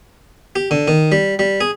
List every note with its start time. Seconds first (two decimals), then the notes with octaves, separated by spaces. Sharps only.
0.56 G4
0.71 D3
0.88 D#3
1.12 G3
1.39 G3
1.61 G#4